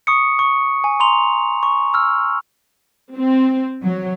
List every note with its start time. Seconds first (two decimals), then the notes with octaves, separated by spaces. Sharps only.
0.07 C#6 D#6 C#7
0.39 C#6
0.84 G#5
1.00 A#5 C6 F7
1.63 C#6
1.94 E6 F6
3.15 C4
3.84 F#3